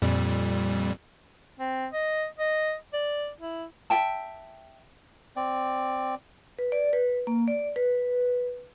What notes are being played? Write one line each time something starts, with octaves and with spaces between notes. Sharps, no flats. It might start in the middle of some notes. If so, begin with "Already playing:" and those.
F2 A#2 G3
C4
D#5
D#5
D5
E4
E5 G5 A5
C4 D5
B4
D5
B4
A#3
D5
B4